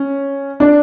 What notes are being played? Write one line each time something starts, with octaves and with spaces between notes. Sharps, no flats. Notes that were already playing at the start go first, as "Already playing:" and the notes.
Already playing: C#4
D4